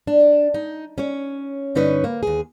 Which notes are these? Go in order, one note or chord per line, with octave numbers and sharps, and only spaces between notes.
D4
D#4
C#4 C#5
G2 D3 C#4 D#4 B4 C#5
A#3
D#2 G#4